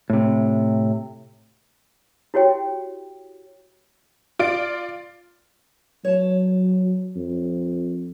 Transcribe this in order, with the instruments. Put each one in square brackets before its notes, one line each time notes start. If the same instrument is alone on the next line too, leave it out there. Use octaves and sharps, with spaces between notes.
[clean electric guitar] A2 C3
[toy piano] E4 F#4 G4 C#5 G5
[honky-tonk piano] F4 D5 D7
[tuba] F#3 [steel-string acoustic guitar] C#5 A5
[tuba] F2